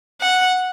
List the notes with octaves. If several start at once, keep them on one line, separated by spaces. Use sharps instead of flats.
F#5